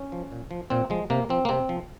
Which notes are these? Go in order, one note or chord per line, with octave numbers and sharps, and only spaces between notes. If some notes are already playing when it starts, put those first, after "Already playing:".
Already playing: C#4
F3
A#2
F3
A#2 C4
F3 G#3
C3 A#3
F3 C4
A#3
C3 C4
F3